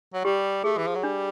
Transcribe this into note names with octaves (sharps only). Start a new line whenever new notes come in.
F#3
G3 G4
A3 G#4
E3
F3
F#3
G3 D4